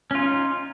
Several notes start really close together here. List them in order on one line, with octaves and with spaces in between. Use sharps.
C#4 F4 D#4